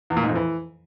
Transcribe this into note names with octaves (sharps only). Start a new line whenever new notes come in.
E2
A#2
G#2
F2
E3